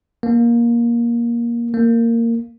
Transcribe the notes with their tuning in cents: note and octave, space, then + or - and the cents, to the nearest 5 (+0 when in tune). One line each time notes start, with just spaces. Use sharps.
A#3 +15
A#3 -15